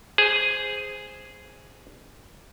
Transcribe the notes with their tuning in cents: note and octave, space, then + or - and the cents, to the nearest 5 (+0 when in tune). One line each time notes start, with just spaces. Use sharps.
G#4 +0 C5 +0